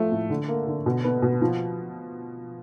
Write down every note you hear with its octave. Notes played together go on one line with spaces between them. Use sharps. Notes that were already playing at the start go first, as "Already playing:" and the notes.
Already playing: F3 A3
A2
D3
A#3
D3
B2
B3
B2
F3